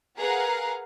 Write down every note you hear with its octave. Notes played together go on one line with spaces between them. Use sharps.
G#4 A#4 B4 F5 F#5 A#5